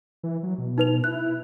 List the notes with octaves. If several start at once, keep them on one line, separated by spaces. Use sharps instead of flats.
E3
F#3
B2
D#4 B4 F7
E4 F#6